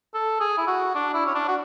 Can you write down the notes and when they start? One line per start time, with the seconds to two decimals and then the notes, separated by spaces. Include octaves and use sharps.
0.14 A4
0.40 G#4
0.58 E4
0.67 F#4
0.95 D4
1.14 E4
1.26 C#4
1.35 D4
1.48 F#4